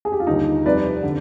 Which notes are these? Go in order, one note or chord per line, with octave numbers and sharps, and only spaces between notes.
G#4
G4
F4
D#2 D3 G3 D#4
F2 C3 G3 B4 D5
D3